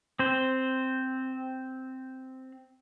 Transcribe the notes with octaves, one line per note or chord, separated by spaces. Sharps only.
C4 C5